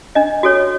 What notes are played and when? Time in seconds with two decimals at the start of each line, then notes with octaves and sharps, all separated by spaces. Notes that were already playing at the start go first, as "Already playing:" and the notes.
0.15 D4 D#5
0.43 F#4 A4 C#5